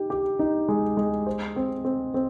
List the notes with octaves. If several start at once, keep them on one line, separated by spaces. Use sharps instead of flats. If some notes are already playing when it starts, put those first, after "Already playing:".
Already playing: D#4 G4
G4
D#4
G#3
G#3
C5
C4
C4
C4